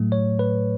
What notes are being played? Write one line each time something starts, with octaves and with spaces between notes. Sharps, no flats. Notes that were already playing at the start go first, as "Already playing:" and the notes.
Already playing: A2 F#3 A3
C#5
B4